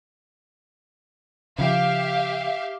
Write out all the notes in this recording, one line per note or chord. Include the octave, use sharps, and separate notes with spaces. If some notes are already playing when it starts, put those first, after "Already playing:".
C#3 F3 G4 E5 F5